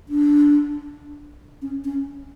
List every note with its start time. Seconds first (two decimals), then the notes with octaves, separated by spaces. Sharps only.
0.09 D4
1.62 C#4
1.84 C#4